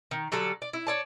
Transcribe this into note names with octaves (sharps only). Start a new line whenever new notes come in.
D#3
D3 F#3 G3 A4
D5
E4
C#5 D5 A5